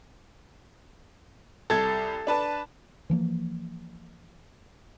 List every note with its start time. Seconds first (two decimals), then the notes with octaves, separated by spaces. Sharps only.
1.70 C2 A4 G#6 A6
2.27 D4 B4 A5
3.10 E3 F3 A#3